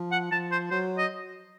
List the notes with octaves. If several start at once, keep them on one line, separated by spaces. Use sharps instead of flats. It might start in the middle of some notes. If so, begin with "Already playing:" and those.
Already playing: F3
F#5
F3 A5
C5
F#3 C5
D#5